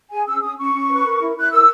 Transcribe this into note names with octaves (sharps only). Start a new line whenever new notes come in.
G#4 G#5
C#4 E6
C#4 D#6
C#4 C#6
C#4
B4
A#4
E4
E4 F#6
A#4 E6